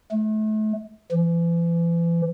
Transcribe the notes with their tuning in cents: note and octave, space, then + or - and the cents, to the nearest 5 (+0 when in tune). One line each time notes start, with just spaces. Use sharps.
A3 -35
E3 +40